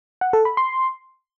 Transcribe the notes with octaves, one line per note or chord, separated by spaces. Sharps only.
F#5
A4
B5
C6